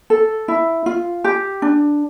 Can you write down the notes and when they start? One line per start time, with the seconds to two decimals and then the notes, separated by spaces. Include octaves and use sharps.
0.10 A4
0.48 E4
0.86 F4
1.24 G4
1.62 D4